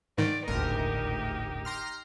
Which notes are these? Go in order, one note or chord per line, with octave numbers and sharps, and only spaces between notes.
G#2 D#3 D5
D#1 G#1 D2 A2 D#4 G4 A#4
A#5 C6 F6